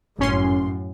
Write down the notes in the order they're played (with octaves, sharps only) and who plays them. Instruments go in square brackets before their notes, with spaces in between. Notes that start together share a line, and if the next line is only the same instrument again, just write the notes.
[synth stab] G1 C#4 C6 [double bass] F#2 A2